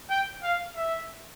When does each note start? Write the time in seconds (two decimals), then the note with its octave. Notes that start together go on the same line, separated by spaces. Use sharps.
0.10 G5
0.43 F5
0.77 E5